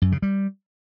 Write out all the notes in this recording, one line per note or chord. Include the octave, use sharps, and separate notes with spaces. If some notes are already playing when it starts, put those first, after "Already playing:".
F#2
C#3
G3